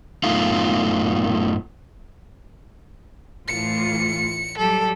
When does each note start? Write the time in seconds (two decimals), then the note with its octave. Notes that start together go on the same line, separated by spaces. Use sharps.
0.23 F#2 A2 A3 B3 D#4 F4
3.48 A2 E3 F4 C#7
4.58 F#3 G3 G4 A4